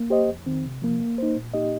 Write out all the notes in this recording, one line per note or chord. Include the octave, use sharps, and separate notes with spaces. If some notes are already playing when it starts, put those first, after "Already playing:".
Already playing: A#3
G4 C5 D#5
F2
D#3 C4
C3
F3 A#3
A#3
D#4 C5
A#2
A#3 D#4 G4 D#5